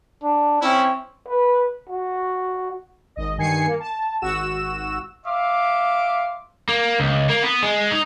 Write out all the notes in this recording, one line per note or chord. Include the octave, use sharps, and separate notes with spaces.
D4
C4 C#4 E4
B4
F#4
G#1 D#5
G2 D#3 G#5 G#6 C7 C#7
A#3
A5
G#1 F#4 E6 E7
E5 F5 C6 D6
A#3
C#2
A#3
B3
G#3
D#4